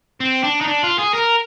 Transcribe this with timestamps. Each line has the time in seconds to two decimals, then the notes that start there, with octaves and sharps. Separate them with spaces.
0.20 C4
0.44 D4
0.61 D#4
0.67 D4
0.83 F4
0.98 G#4
1.14 A#4